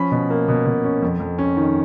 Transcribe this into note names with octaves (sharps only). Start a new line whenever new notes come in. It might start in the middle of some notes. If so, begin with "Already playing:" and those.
Already playing: F3 C#4 B5
B2
A#3
B2
B2
C#4
F2
F2
C#4
D#3